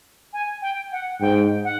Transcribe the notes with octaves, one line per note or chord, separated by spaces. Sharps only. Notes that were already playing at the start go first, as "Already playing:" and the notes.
G#5
G5
F#5
G#2 G5
F#5